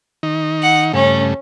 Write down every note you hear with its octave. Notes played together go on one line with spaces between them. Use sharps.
D#3 D#4
F#5
G2 C#3 A3 C#4